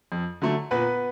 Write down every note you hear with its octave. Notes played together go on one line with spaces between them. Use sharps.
F2
D3 F#3 A3
A#2 B3 B4